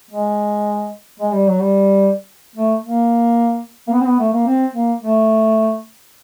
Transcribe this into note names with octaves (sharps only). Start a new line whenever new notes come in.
G#3
G#3
G3
F#3
G3
A3
A#3
A#3
B3
C4
B3
A3
A#3
C4
A#3
A3